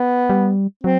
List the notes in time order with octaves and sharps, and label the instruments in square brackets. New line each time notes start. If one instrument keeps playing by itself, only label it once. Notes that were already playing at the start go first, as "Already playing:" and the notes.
Already playing: [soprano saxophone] B3
[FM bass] G3
[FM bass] F#3 [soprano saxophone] C4